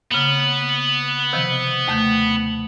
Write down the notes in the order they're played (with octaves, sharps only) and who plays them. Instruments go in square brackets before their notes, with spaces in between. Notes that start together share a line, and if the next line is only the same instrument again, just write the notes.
[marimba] C#3 A#3 [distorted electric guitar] B3
[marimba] C3 D#3 F3
D#2 A3 G6